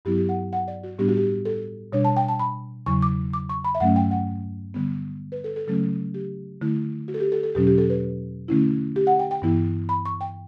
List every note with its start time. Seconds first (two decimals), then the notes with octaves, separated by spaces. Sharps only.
0.05 G2 F#3 B3 E4 G4
0.18 G4
0.29 F#5
0.53 F#5
0.68 D5
0.84 F#4
0.99 A2 G3 B3 D4 G4
1.08 F#4
1.17 G4
1.45 A4
1.92 B2 G3 D4 C#5
2.05 A5
2.17 G5
2.29 A5
2.39 B5
2.86 E2 C#3 F#3 C#6
3.02 D6
3.33 D6
3.49 C#6
3.64 B5
3.75 E5
3.80 G2 F#3 A3 C#4 F#5
3.96 G5
4.11 F#5
4.74 D3 G3 B3
5.32 B4
5.44 A4
5.56 A4
5.67 C#3 F#3 A3 C#4 A4
6.14 G4
6.61 D3 A3 E4
7.08 F#4
7.14 A4
7.20 G4
7.32 A4
7.43 A4
7.55 E2 B2 F#3 C#4 G4
7.67 G4
7.78 A4
7.90 B4
8.48 D3 A3 C#4 E4
8.96 G4
9.07 F#5
9.19 G5
9.31 G5
9.42 G2 E3 B3 E4
9.89 B5
10.06 C#6
10.21 G5